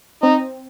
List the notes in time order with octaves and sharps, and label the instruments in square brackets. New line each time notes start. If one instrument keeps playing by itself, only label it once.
[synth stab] C4 [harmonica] D#4